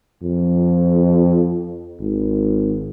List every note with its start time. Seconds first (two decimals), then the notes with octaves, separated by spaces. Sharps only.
0.22 F2
2.00 G#1